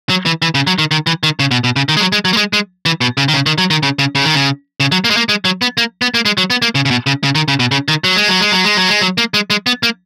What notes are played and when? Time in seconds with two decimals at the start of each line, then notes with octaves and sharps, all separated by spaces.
0.10 F#3
0.26 E3
0.42 E3
0.55 C#3
0.67 F#3
0.79 D#3
0.91 D#3
1.07 E3
1.23 D#3
1.40 C#3
1.51 B2
1.64 B2
1.76 C#3
1.89 D#3
1.97 G#3
2.01 F#3
2.12 G#3
2.25 F#3
2.33 A#3
2.37 G#3
2.53 G#3
2.86 E3
3.01 B2
3.17 C#3
3.28 D#3
3.34 C#3
3.46 D#3
3.58 F#3
3.70 D#3
3.83 C#3
3.99 C#3
4.15 C#3
4.25 D#3
4.34 C#3
4.80 C#3
4.92 F#3
5.04 A#3
5.10 G#3
5.17 A#3
5.29 G#3
5.45 F#3
5.62 B3
5.78 A#3
6.02 B3
6.14 A#3
6.25 G#3
6.38 F#3
6.50 B3
6.62 A#3
6.75 C#3
6.86 C#3
6.91 B2
7.07 C#3
7.24 C#3
7.35 D#3
7.48 C#3
7.60 B2
7.72 C#3
7.88 D#3
8.04 F#3
8.16 G#3
8.28 F#3
8.40 G#3
8.52 F#3
8.64 G#3
8.77 F#3
8.89 G#3
9.01 F#3
9.18 A#3
9.34 G#3
9.50 G#3
9.67 B3
9.83 A#3